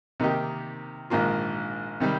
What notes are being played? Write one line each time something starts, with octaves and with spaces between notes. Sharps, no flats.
C3 D#3 A#3 D#4 G4
A#1 G#2 D#3 A#3 F4
C3 D#3 G3